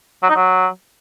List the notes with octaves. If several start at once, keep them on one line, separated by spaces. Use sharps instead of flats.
F#3
D#4
F#3